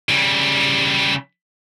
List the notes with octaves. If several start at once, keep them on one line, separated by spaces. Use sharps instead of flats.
C#3 G3